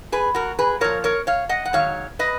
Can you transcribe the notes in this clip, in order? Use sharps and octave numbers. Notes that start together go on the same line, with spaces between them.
G#4 B4
F#4 A#4
G#4 B4
A#2 F3 A#4 C#5
A#4 C#5
C#5 F5
D#5 F#5
F#5
G#2 D#3 F#3 C#5 F5
B4 D#5